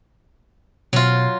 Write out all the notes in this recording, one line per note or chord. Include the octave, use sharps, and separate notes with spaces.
B2 F#3 F4